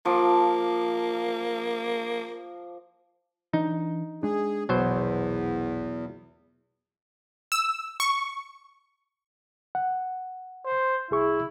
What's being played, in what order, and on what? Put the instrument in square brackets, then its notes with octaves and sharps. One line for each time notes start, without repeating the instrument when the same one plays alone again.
[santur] F3 D6 [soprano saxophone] A#3
[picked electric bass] E3 D4 [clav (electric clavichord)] D#4
[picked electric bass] G#3 D4 [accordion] G#4
[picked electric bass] A#1 [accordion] E2 [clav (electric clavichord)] B2 F#3 C5
[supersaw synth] E6
C#6
[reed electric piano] F#5
[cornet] C5
[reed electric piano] C2 G#4 C#6 [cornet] E4